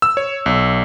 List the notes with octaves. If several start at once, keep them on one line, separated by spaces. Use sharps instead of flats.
E6
C#5
B1